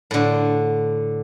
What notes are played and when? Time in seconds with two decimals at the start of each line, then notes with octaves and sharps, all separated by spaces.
0.11 A2 D3